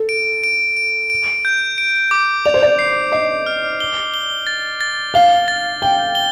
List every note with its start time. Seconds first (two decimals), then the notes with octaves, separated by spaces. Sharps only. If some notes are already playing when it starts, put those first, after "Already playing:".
Already playing: A4
0.09 D7
0.44 D7
0.77 D7
1.10 D7
1.45 G6
1.78 D7
2.11 D6
2.45 D5 F7
2.54 C5
2.62 D5
2.79 C7
3.12 D#5 C7
3.46 F6
3.80 G7
4.14 G7
4.47 A6
4.81 A6
5.14 F5 G7
5.48 A6
5.82 G5 G7
6.15 G7